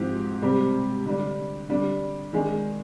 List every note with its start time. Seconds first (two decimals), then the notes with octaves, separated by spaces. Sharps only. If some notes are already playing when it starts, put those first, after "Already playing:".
Already playing: G#2 F3 C4 D#4 G4
0.42 C3 G3 C4 G4
1.06 D3 G3 D4
1.69 D3 G3 D4
2.33 D#3 G#3 D4 G#4